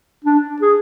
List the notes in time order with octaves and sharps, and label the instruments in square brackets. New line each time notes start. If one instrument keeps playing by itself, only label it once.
[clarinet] D4
G#4